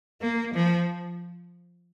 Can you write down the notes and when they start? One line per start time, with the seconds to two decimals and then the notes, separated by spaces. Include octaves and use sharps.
0.22 A#3
0.54 F3